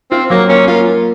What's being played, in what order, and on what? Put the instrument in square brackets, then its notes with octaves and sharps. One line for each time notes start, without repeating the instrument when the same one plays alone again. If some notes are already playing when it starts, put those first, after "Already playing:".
[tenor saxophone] C4 [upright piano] F4
[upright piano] F#3 [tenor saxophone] A#3
[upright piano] A#3 [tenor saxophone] C#4
[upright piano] A#3 [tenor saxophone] F4
[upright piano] A#3